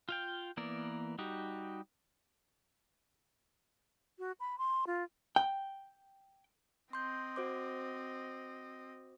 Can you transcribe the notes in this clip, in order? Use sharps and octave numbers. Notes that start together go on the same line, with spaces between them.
F4 F5 G5
E3 A#3 B3 A#4 D5
G3 D#4 F#4 G4
F#4
B5
C6
F4
G5
C4 D#5 C6 G6
F#4 C5 D6